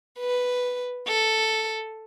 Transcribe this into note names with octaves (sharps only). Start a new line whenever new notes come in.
B4
A4